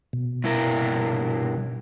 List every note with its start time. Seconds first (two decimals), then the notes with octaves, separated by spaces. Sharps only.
0.13 B2
0.44 G2 E4 A#4